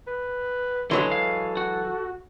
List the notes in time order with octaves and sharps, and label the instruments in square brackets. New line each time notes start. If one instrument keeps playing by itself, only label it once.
[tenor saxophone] B4
[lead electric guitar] D3 C6 [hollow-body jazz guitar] E3 F#3 G#3 [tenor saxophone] A4
[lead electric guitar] F5
F#4